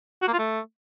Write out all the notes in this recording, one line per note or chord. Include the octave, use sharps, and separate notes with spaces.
F#4
A#3
F4
A3